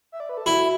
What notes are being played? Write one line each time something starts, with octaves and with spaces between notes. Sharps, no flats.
E5
D5
B4
A4
E4 F#4